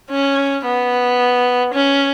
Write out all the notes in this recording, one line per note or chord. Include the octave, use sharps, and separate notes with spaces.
C#4
B3
C#4